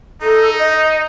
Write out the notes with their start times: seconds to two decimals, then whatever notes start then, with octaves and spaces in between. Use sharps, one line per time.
0.22 D#4 A4
0.59 D#5